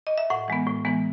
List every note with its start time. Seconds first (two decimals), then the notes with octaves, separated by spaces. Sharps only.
0.07 D#5
0.18 E5
0.30 A2 F#5
0.48 E3 G#3 B3
0.67 A2
0.85 E3 G#3 B3